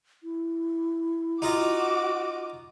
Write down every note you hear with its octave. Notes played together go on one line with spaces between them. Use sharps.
E4
D#4 F4 F#4 D#5 D6